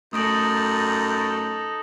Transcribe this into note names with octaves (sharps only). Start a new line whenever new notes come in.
F#2 A3 D#4 A4 D#6 A#6 D7 F#7